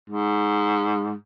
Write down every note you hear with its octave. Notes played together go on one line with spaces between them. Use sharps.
G#2